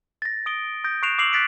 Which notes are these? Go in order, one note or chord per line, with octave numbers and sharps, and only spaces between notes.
A6 A#6
D#6 D7 G7
D#6 G6 A#6 D7
C#6 F#6 C7 D7 E7 F7
C#6 D6 E6 C7 F7 F#7
F#6 A6 B6 D7